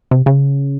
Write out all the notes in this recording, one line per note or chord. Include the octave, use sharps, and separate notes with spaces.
C3
C#3